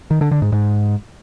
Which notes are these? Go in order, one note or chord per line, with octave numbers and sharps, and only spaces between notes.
D#3
D3
D3
G#2
G#2